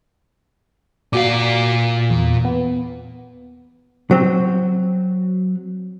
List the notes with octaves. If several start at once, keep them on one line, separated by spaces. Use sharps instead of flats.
A#2 F#4 D5 F5
E2
B3
F#3 C4